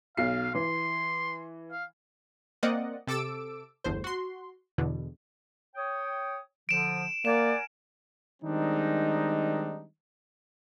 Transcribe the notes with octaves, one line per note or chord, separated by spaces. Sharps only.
B1 F5 C7
E3 C6
F5
A#3 C4 D5 D#5 F#5
C3 A4 D6 E6 D7
G1 E2 A2 C5
F#4 C6
E2 B2 D3
C#5 G5 D#6
D3 F3 D7 E7
A#3 A#4 D5 F#5 G#5 E7
D#3 G3 G#3 C4 D4 D#4